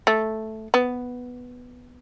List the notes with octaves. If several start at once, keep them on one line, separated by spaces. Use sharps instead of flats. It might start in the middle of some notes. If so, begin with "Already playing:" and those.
A3
B3